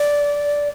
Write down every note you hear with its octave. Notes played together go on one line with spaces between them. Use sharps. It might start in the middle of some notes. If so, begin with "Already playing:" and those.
Already playing: D5